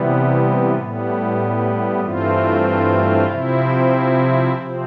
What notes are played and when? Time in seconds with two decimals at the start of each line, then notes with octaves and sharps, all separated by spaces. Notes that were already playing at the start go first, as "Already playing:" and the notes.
Already playing: C3 E3 G3 B3
0.74 A2 G3 B3
2.00 G2 E3 A3 C4 F4
3.26 C3 F3 C4 E4
4.53 C3 F3 C4